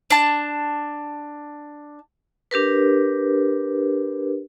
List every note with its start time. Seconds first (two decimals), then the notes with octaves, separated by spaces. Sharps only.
0.10 D4 A5
2.51 D4 G4 A#4 B4